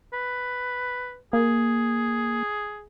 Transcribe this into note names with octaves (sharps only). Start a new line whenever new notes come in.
B4
A#3 G#4